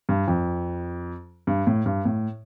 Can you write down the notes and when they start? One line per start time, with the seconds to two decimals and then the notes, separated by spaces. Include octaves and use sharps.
0.09 G2
0.28 F2
1.47 G2
1.67 A2
1.86 G2
2.05 A2